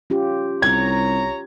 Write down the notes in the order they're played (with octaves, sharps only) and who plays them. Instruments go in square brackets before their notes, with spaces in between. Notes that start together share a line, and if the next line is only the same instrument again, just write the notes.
[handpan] C#4 F4 G4
[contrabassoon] C2 [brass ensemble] C#5 A#5 [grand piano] G#6